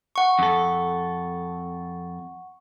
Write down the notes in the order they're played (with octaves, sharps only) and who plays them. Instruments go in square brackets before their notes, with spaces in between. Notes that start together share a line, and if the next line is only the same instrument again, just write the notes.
[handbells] F#5 C#6
[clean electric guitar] F2 A4